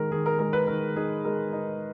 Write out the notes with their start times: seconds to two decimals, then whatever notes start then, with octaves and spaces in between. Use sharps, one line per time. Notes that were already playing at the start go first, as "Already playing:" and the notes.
Already playing: D#3 G#3 A#4
0.11 D#3 G#4
0.26 A#4
0.39 G#3 A#4
0.53 B4
0.67 D#3 A#4
0.96 D#4 G#4
1.25 G#3 A#4
1.53 D#4